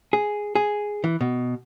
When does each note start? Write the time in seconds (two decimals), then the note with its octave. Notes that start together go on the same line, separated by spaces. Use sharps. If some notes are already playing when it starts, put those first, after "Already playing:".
0.13 G#4
0.55 G#4
1.04 E3
1.21 B2